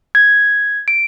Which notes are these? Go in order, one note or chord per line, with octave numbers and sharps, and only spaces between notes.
G#6
D7